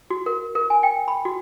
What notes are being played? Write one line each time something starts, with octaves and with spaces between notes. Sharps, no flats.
F#4
A#4
A#4
G#5
G5
B5
F#4